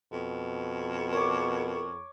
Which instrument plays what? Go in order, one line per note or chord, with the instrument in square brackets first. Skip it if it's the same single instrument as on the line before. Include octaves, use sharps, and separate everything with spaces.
[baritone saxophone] F2 [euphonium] B2
[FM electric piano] A#4 [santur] C#5 D6